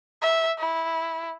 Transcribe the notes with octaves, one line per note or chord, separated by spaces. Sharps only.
E5
E4